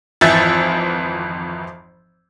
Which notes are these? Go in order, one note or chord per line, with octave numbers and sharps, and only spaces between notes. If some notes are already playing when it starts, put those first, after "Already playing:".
G#1 F2 E3 E5 G6 A6